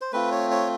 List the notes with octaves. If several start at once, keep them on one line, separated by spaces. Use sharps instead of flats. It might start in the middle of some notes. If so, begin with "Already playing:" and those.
C5
A3 C4 F4 B4
C#5
C#5